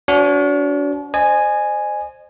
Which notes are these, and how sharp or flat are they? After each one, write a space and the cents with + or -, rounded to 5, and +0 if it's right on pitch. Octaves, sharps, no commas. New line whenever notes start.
D4 -40 F#4 +0 C5 +0
C5 +0 D#5 -40 G#5 +0